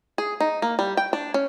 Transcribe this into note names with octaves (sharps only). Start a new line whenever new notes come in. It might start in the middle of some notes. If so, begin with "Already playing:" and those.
G#4
D#4
A#3
G3
G5
D4
C#4